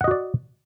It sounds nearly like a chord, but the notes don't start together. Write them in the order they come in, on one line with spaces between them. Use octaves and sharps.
F#5 D#5 F#4 D5